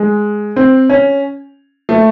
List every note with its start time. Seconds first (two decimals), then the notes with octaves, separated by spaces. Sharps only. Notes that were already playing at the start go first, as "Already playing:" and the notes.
Already playing: G#3
0.56 C4
0.90 C#4
1.89 A3